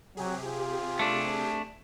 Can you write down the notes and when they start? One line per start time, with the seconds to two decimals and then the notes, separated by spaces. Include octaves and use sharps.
0.17 C3 F#3 G4 G#4
0.46 F4
0.99 A3 D4